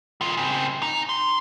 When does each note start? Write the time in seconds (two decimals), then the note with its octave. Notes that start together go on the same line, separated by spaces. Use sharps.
0.21 D#3 F4
0.37 C#3 C4
0.82 D#4
1.09 C6